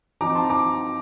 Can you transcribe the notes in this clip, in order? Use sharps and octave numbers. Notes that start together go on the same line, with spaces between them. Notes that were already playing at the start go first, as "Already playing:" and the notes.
F3 C4 D#4 A#5 D6
A5 C6
A#5 D6